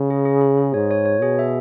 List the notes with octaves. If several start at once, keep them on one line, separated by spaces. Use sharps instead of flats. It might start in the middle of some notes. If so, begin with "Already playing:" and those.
Already playing: C#3
G#4
G#4
G#4
G#4
G#2 C#5
C#5
C#5
B2 G#4
E5